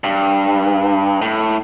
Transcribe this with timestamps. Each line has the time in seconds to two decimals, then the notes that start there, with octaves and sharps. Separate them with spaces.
0.04 G2
1.22 A2